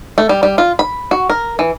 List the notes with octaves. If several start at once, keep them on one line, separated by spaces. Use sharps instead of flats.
A3
G3
G3
F4
B5
F#4
A#4
E3